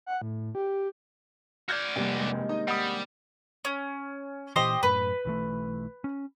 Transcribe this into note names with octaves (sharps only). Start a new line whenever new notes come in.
F#5
A2
G4
F#4 D5 F6 G6 G#6
F1 C3 G3 A#3
G2 D#3 G#3
D#4 D#5
G3 F#5 B5 D#6
C#4
A#2 E3 G4 C5 D#5
F#2 A2 B4
B1 E3 A3
C#4